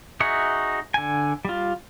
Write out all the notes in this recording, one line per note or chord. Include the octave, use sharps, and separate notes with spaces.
D#4 F#4 G#4 E5 C#6
D3 G#5
G3 F4